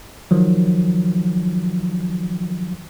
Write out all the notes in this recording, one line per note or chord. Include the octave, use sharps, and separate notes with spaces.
D#3 F3 F#3